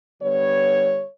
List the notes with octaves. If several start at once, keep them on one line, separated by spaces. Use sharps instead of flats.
D3 G3 B3 C#5